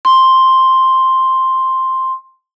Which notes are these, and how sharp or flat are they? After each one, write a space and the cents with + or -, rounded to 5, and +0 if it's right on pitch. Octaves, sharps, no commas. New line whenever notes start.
C6 +5